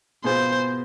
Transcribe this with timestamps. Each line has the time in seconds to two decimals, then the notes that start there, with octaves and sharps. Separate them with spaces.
0.24 B2 B3 F4 G#4 C5